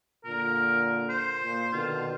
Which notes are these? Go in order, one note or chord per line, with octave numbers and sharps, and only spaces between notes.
A#2 D3 A#4
C5
A#2
B2 D3 D#3 F4